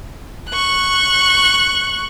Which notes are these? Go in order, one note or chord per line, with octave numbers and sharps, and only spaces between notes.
C#6 F#6